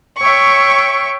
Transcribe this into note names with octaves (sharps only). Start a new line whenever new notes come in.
C#5 E5 G5 C#6